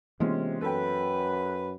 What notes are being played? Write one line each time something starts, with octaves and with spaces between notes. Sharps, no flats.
C3 E3 G#3 A#3 B3 C#4 F4
F#2 A4 B4 G5